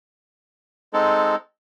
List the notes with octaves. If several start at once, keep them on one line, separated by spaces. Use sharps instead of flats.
G#3 C4 D#4 A4